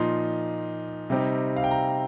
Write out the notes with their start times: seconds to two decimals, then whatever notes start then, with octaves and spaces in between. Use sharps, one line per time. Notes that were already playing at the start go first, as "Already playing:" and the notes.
Already playing: A#2 F3 D#4 C6
1.10 C3 G3 C4 D#4
1.56 F5
1.64 G5
1.71 A#5